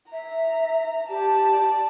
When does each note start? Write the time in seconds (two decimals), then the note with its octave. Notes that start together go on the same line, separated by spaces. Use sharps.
0.12 E5 A#5
1.09 G4 D5 A5